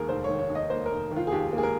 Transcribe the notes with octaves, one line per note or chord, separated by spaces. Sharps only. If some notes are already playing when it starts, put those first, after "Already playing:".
Already playing: D#2 D#3 A#3 G#4 A#4
F1 C5
D#3 C#5
C#5
D#2
D#5
A#3 C5
A#4
F1
D#3
F4
G#4
D#2 G4
A#3
G#4
A#4